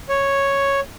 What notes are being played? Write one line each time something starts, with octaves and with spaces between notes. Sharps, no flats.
C#5